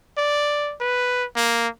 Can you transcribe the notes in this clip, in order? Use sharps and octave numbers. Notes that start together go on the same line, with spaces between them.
D5
B4
A#3